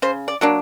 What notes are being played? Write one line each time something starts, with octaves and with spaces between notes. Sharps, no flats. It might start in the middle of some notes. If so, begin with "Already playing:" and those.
C#3 C5
D5
F#3 A#3 D4